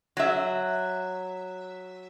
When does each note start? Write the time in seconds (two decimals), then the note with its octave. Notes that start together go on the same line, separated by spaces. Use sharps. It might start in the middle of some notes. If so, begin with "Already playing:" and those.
0.17 F#3 E5